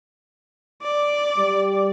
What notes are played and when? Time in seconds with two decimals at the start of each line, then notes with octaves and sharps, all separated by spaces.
0.82 D5
1.36 G3